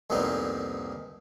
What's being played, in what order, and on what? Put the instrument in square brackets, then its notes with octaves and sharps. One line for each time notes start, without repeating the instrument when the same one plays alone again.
[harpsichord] C2 F2 A#2 B3 C4 D#4